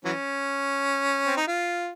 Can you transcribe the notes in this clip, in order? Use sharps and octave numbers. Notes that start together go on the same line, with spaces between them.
E3 F#3 C#4
C4
D#4
F4